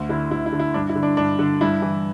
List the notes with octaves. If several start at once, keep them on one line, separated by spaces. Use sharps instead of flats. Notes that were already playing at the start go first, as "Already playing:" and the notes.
Already playing: D2
D3 E4
D2 E4
E4
D3
E4
G2 D4
E4
D3
D4
G2 D4
D3
G2 E4
E3